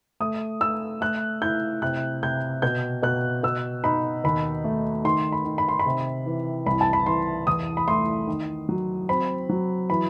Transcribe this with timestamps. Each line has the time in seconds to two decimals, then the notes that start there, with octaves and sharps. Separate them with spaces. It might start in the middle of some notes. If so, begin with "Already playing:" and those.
0.20 A3 D#6
0.61 A3 E6
1.01 A3 F#6
1.42 E4 G6
1.82 C3 F#6
2.23 C3 G6
2.62 B2 G6
3.03 B2 F#6
3.43 B2 E6
3.84 D#4 B5
4.24 D#2 B5
4.64 A3
5.04 D#3 C6
5.32 B5
5.45 D#3
5.58 B5
5.69 C6
5.79 B5
5.86 C3
6.26 E3
6.66 C2 B5
6.81 A5
6.93 B5
7.06 E3 C6
7.47 E2 D#6
7.77 B5
7.87 A3 C6
8.27 D#3
8.69 F#3
9.09 C4 B5
9.49 F#3
9.90 E3 B5